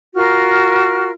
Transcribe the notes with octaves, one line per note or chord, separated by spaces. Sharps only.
F4 F#4 A#4 F6